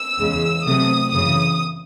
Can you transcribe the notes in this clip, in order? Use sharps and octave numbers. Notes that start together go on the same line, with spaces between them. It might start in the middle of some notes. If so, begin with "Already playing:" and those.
Already playing: E6
E2 C#3 G#3
C3 F#3 A3 D#6
F#2 C#3 E3 D#6